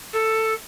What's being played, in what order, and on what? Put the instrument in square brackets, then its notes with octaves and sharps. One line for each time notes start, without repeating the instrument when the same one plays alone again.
[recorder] A4